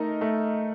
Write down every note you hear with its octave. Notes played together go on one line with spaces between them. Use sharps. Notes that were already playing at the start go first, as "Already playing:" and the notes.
Already playing: A3 D#4 A#4 D#5
A3